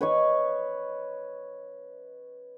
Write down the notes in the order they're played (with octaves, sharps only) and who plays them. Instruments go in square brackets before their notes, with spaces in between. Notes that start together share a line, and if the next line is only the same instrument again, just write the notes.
[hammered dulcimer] B4 C#5 D#5 C#6